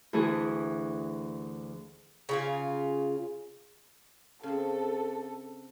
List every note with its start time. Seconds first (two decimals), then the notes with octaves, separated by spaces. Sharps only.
0.13 D2 E3 E4 G#4 C#6
2.29 C#3 F4 G#5
4.43 C#3 C4 A4